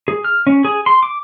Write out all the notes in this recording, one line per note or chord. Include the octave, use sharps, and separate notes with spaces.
G#4
F6
C#4
G#4
C6
D6